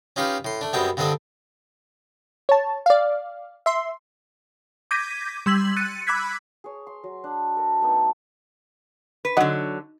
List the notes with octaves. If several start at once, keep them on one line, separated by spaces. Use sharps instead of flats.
C#4 D#4 F4 G4 B4 F5
A2 C6
A3 D4
F#2 G3 G#3 B3 C4 G5
G2 D3 C4 D4 A4 D#5
C#5 A5
D5 F5
E5 C6
D6 G6 G#6 A#6 B6 D#7
G3 C6 E6 G#6 B6 F#7
F#6 A6 C#7 D#7
B5 D6 E6 F#6 G#6 B6
G#4 C#5
C6
F#3
D4
A4 A#4
A3 B3 D#4 A5
B4
D3 F#3 D#4 F#5